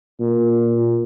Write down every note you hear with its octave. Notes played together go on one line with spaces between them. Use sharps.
A#2